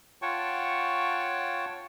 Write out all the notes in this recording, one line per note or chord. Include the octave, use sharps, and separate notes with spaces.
F4 C#5 F#5 G5 A5 C#6